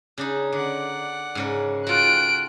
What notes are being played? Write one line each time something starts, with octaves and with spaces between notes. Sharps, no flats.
C#3 D4 D#4
D3 D5 F#5
G#2 C#3 A#4
F4 F#4 A4 G5 F#6 D7